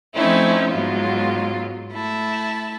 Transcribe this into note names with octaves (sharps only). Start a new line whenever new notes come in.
F3 A3 C4 C#4 D#4 E4
G#2 F#3 G#3 B3 F4
A3 E4 A5